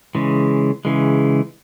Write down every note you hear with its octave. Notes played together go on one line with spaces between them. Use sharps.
C#3 E3 G#3
C#3 E3 G#3